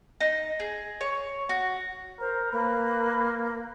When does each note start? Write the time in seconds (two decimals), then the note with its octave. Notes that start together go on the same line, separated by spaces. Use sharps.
0.21 D#4
0.60 G#4
1.01 C#5
1.49 F#4
2.20 A#4 C5
2.52 A#3 B4